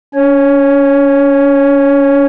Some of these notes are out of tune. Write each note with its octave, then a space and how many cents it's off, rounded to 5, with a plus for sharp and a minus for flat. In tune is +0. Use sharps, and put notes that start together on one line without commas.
C#4 +40 C#5 +0